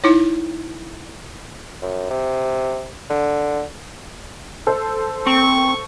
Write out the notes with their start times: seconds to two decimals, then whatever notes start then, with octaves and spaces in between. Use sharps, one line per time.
0.04 D#4 E4 C#5
1.82 F#2
2.10 C3
3.10 D3
4.67 A4 C5
5.27 C4 C#6